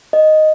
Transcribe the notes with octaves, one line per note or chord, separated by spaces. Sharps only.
D#5